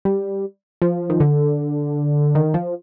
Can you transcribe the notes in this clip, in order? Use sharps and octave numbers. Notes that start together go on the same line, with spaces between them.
G3
F3
D#3
D3
D#3
F3